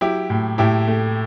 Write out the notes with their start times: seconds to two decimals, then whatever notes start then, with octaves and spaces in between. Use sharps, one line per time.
0.01 F#3 E4 G4
0.30 A2
0.58 A2 E4 G4
0.88 A3